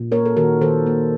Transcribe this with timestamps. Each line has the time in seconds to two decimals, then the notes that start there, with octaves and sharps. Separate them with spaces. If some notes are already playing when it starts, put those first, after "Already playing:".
Already playing: A#2
0.12 A#3 A#4 C#5
0.25 A4
0.37 D#3 F#4 A#4
0.61 D#3 A4 C5
0.86 A#3